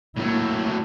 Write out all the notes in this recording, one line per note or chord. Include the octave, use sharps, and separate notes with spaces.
A2 F#3 A#3 E4